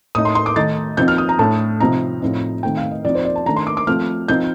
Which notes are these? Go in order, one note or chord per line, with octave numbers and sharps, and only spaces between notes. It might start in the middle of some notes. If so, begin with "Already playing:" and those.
A2 A3 D#4 D#6
C6
C6
D6
D#3 A3 D#4 A6
F3 C4 D#4 G6
F6
D#6
A#5
A2 A3 D4 A5
C3 F3 C4 D#4 A#5
A2 F3 C4 D#4
D#3 A3 C4 D#4 G5
F5
D#5
F3 C4 D#4 D5
C5
D5
A5
D#3 A3 D4 A#5
C6
D6
D6
F3 A3 C4 F6
F3 C4 D#4 G6